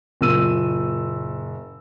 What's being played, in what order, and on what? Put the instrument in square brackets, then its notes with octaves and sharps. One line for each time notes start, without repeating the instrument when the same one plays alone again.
[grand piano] F#1 A#2 E6 D#7